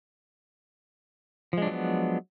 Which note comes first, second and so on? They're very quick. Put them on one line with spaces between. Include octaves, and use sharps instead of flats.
F3 G#3 D4 F#3 B3